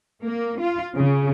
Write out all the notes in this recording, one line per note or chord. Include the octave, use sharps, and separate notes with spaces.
A#3
F4
C#3